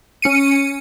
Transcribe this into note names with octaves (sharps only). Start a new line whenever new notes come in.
C#4 C#7 D#7